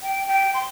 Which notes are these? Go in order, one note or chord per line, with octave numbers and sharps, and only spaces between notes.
G5
G5
C6